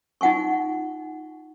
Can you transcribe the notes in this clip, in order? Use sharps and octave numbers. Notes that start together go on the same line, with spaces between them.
D#4 F4 F#5 G#5 C#6